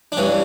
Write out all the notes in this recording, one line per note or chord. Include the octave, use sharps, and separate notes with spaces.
D4
G2 E3 C#4